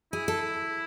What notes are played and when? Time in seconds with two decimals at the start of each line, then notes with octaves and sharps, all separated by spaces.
0.13 E4 G#4
0.28 A4